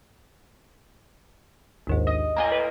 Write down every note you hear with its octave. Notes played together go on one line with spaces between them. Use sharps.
A#1 D#2 G#2
D#5
A2 A#3 D#5 G#5 A#5
B4